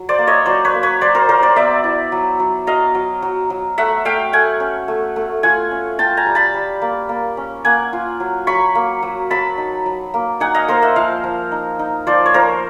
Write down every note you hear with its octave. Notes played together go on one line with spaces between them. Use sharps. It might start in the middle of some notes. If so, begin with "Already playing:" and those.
Already playing: F#3
C5 D5
A#3
C#5 D#5
F#3 C5 D5
B4 C#5
A#3
B4 C#5
F#3 C5 D5
A#4 C5
F#3 A#4 C5
C5 D5
B3 D5 E5
E4
F#3
F#3
F#3 D#5 F5
F#3
F#3
F#3
A3 E5 F#5
A3 F5 G5
A3 F#5 G#5
C#4
A3
A3
F4 F#5 G#5
C#4
F4 G5 A5
G#5 A#5
G3
A5 B5
G3
A#3
A#3
C#4
A#3 F#5 G#5
F4
F#3
F#3 B5 C#6
A#3
F#3
F#3 A5 B5
D#4
F#3
A#3
D#4 F#5 G#5
D#5 F5
A#3 A#4 C5
E5 F#5
F3 D#5 F5
F3
D#4
D#4
F3 C5 D5
C#5
F3 A#4 C5